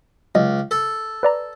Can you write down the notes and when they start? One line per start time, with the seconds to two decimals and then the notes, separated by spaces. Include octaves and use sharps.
0.35 C#2 F#3 D#5
0.71 A4
1.23 B4 D5 A#5